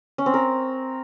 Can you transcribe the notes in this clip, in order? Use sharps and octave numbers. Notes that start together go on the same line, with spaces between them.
C#4
C4
A#4